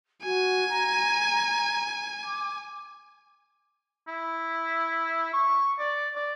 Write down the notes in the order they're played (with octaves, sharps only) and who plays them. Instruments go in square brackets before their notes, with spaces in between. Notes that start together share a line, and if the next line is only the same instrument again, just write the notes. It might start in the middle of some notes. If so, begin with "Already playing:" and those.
[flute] F#4 [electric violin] G#5
[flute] A#5
D6
[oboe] E4
C#6
D5
D5